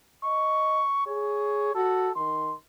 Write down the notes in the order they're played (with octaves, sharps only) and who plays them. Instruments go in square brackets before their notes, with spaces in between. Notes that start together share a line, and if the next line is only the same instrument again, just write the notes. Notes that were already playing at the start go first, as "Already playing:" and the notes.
[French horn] D#5 [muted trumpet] C#6
[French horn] G#4 [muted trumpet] C#5
[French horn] F#4 [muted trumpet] A4
[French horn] D#3 [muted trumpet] C6